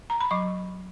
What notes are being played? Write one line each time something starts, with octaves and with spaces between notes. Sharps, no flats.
A#5
B5
F#3 C#6